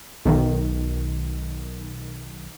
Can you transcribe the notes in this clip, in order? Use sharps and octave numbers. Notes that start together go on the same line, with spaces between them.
B1 D#3